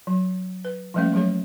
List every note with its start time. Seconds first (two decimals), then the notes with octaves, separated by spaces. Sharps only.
0.07 F#3
0.65 B4
0.94 F3 G3 A3 A#3 C#4 F5
1.13 F#3 A3 G#4 C#5